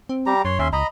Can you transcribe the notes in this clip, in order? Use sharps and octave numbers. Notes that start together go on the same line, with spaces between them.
C4
G3 G4 A#5
F#2 C#5 C6
D#2 C#4 E5 C6
C#2 D#5 A#5 B5